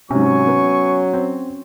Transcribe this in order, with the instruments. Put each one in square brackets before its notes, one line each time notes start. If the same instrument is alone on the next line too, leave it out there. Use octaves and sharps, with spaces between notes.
[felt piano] G#2 C3 [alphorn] F#3 [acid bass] C#4 [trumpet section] G#5 C#6
[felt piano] B3
C4